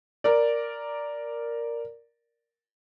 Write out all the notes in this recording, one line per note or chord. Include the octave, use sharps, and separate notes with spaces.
A#4 D5